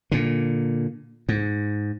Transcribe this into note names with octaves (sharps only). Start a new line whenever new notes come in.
A#2 D3
G#2